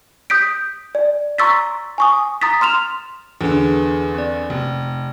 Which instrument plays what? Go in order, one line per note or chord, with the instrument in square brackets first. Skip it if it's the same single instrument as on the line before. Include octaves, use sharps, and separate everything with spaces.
[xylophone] D#6 G6 B6 D7
D5
A#5 C6 C#6 E6 A6 B6
G#5 C#6 D#6
A#5 D#6 A6 B6
C6 F6 E7 F7
[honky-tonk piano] E2 D3 [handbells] G#4 A4 B4
[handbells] C4 D5
[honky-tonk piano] F1